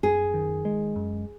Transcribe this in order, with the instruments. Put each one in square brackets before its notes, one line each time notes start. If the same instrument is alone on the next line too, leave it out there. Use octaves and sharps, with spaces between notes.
[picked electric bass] F#2 [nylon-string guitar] G#4
[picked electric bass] D#3
G#3
F#2